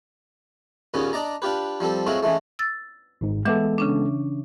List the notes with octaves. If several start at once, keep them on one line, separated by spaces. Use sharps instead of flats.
D#2 A#2 C#3 B3 C#4
D4 D5 D#5 A#5
D4 F4 G4 B4
F3 G3 C4 A4
A2 F#3 G#3 C4 F4 F#4
C#3 E3 G#3 A3
E6 A6
G#1 G#2
E3 G#3 B3 A4 E5 D6
C#3 C#4 D4